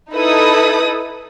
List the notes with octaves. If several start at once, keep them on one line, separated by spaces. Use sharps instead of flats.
D#4 E4 A4 B4 D#6